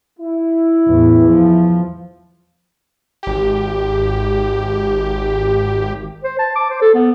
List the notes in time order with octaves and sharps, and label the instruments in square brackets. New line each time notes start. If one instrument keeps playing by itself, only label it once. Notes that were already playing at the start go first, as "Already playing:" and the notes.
[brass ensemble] E4
[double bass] E2 A2
F3
[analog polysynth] G#1 G4
[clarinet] C5
A5
D6
C5
A4
B3